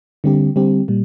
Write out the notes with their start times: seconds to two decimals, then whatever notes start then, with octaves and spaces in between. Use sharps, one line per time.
0.24 D3 G3 C4 G4
0.56 D3 G3 C4 G4
0.88 A#2 G3